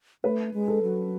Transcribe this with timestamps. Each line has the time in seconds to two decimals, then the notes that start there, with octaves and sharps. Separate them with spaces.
0.24 A3 B4
0.54 G#3
0.68 A4
0.83 F#3